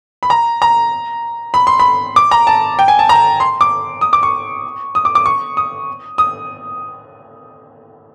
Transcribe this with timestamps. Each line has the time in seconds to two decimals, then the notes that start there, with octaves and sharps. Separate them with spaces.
0.23 B5
0.30 A#5
0.62 A#5
1.54 B5
1.67 C6
1.80 B5
2.16 D6
2.31 A#5
2.47 A5
2.79 G5
2.88 G#5
2.99 A5
3.09 A#5
3.40 C6
3.61 D6
4.01 D#6
4.13 D6
4.23 C#6
4.95 D#6
5.05 D6
5.15 D6
5.26 C#6
5.57 D#6
6.18 D#6